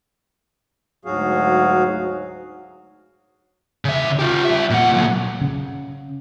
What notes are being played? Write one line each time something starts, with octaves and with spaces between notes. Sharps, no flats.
D2 G#2 F#3 F#4 G#4 F5
C#3 E5
F4 G4
G3 E5
A#2 F#5
A#2 F#3
C#3